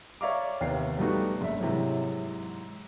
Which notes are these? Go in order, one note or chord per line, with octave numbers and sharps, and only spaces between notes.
C#5 D5 E5 F5 A#5 D6
D#2 C3 B3 F5 C7
G3 A3 B3 D#4 F#4 G4
F#1 G2 E5
G#2 C3 E3 F#3